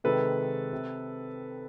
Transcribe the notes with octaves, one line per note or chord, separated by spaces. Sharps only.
C3 D#3 G#3 A4 B4
C3